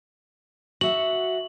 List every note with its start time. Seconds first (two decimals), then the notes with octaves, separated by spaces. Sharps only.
0.81 F#4 E5 F#5 F#7